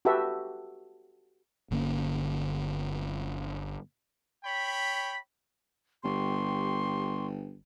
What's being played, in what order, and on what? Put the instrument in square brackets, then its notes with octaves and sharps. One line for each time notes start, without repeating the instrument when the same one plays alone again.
[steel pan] F#4 G4 A4 B4 E5
[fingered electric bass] G1 D3 A#3 C#4
[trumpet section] C#5 G5 B5
[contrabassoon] G1 [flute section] G4 C6 C#6